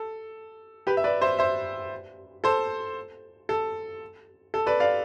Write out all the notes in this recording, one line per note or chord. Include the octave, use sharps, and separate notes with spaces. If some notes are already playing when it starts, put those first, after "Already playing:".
Already playing: A4
G4 B4
E5
B4 D5
C5 E5
C5 E5
A4 C5
A4
A4
B4 D5
D5 F5